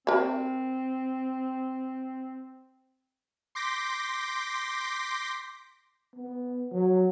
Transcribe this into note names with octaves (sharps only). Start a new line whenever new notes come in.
C4 A#4 B5
C6 D6 G6 A#6 B6
B3
F#3